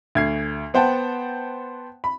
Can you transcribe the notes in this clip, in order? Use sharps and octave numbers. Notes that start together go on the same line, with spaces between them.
D2 G#6 C7
B3 C5 F#5 G5 A5
B5